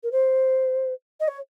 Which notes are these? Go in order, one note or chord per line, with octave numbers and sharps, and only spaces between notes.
A#4
C5
D#5
C#5